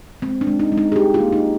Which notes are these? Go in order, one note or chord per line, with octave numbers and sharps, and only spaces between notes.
G#3 C4
D4
G#3
D#4
G#3
D#4
G#4
G3 G4
F4
A#3
D#4